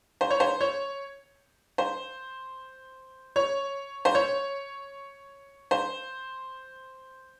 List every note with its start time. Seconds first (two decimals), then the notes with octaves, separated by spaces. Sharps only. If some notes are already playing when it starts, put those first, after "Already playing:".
0.21 C5
0.30 C#5
0.40 C5
0.61 C#5
1.78 C5
3.36 C#5
4.05 C5
4.15 C#5
5.71 C5